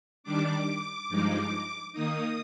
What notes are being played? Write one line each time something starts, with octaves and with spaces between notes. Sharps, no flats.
D#3 G3 D4 D6
G2 F3 G#3 D#4
D#3 A#3 D#4 D#6